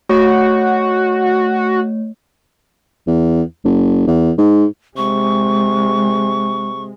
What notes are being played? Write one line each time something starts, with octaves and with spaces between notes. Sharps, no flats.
A3 F#4 C#5
E2
F#1
E2
G#2
C3 G#3 C#6